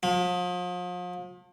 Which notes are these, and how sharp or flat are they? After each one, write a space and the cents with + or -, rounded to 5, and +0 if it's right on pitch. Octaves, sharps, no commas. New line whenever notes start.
F3 +40